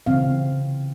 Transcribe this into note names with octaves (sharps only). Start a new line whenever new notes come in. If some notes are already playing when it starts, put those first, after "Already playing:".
C#3 E3 C4 F5